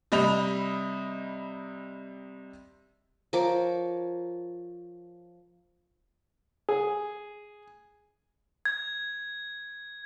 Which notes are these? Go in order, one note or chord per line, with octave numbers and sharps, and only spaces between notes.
C3 G3 D#5 B5 F7
F3 A#4 C#5 D6
G#4
G#6